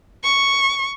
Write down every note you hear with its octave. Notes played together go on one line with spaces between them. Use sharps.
C#6